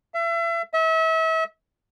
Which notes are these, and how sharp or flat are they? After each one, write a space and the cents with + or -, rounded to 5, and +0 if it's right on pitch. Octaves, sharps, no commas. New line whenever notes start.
E5 +35
E5 -35